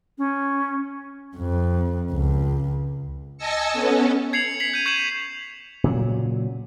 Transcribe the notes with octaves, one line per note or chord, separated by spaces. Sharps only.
C#4
F2
C#2
D#5 G#5 A5 E6 A#6 C#7
B3 C#4 A4
G#6 C7 C#7 F7 F#7
B6 C7 F7 F#7
G6 D#7
C#6 G6 G#6 C#7 E7 F#7
A#2 C#3 F#3